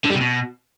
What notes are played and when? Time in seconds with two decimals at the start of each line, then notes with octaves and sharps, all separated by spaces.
0.04 D3
0.10 G3
0.15 C3
0.20 B2